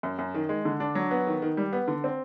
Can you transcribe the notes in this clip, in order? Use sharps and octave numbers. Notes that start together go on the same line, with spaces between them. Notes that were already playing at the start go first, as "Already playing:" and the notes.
F#2
F#2
D#3
G#3
D3
D4
F#3
B3
D#3
D#3
G3
B3
D3
C4